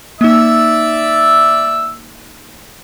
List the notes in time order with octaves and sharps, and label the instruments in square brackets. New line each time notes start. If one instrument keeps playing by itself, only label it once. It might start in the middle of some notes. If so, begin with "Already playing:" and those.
[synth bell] A#3 D#4 [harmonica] D5 E5 E6